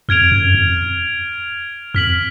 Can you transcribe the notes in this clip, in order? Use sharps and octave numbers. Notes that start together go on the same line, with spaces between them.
F2 F6 G#6 D7 F7
F#2
F2
F2 F6 B6 F#7